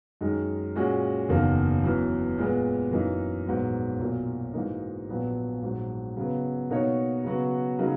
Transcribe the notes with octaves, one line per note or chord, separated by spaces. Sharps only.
F#2 D#3 G#3 D#4
A#2 G#3 C#4 F#4
F#1 E2 D#3 A#3
F#2 E3 B3
A#2 G#3 B3
F#2 E3 A#3 D#4
A#1 G#2 F#3 B3
B1 A#2 A#3
G#2 E3 A#3 D#4
A#1 A#2 F#3 B3
A#1 G#2 F#3
C#3 F#3 B3
B2 A#3 D#4 F#4 C#5
C#3 F#3 B3 F#4
C#3 F#3 A#3 D#4